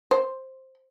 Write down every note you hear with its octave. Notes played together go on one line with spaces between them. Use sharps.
C5